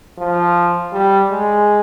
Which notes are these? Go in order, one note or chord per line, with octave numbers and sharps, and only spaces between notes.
F3
G3
G#3